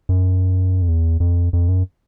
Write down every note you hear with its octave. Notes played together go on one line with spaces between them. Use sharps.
F#2
F2
E2
F2
F2
F#2